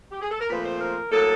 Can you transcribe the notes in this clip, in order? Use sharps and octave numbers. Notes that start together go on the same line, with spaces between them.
G4
G#4
A4
A#4
A#2 F3 A3 C4 B4
C5
A#4
A2 F#3 A#3 A4